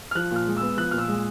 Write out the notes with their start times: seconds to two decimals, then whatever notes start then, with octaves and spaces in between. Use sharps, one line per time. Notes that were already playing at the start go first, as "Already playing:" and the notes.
0.11 F6
0.15 F3 F#6
0.31 A#2 F6
0.47 G#3
0.57 B3 E6
0.77 F3 F#6
0.91 A#2 F6
0.98 E6
1.08 G#3